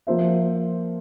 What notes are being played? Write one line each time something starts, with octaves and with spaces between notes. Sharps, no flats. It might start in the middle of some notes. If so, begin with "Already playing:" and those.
F3 A#3 F4 C5 E5